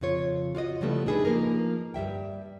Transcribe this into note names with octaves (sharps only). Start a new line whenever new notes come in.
F2 C#3 F4 C#5
F4 F#4 D5 D#5
C#3 F3 G3 A3 B3 E4
D4 D#4 G#4 A4 B4
F3 A#3 D#4 A#4
G2 G3 E5 G5